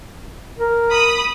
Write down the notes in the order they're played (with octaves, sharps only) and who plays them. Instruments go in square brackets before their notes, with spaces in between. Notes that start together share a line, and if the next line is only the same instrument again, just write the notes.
[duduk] A#4
[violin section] B5 D#6